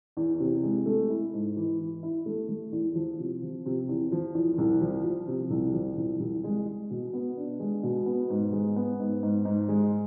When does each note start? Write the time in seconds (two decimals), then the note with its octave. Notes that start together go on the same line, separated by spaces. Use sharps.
0.17 E2
0.40 C3
0.63 G#3
0.86 A3
1.10 E4
1.34 G#2
1.56 E3
1.80 E3
2.03 E4
2.26 A3
2.49 A3
2.72 E2
2.95 F3
3.19 C3
3.42 F3
3.66 C3
3.89 E2
4.12 F3
4.34 E2
4.58 C2
4.81 F3
5.04 F3
5.28 C3
5.50 C2
5.74 F3
5.97 C2
6.20 C2
6.44 G#3
6.67 G#3
6.90 B2
7.13 B3
7.37 D4
7.60 G#3
7.83 B2
8.06 B3
8.30 G#2
8.53 G#3
8.76 B3
9.00 G#2
9.23 G#2
9.45 G#2
9.69 G#3